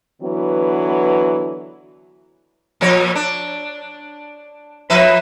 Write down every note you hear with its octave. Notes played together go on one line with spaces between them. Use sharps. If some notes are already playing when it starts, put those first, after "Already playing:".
D3 E3 F#3 B3
A#2 F3 C#5
D4
F3 B4 E5